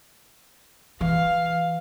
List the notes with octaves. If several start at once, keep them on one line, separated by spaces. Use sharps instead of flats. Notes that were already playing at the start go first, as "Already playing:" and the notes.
E3 F5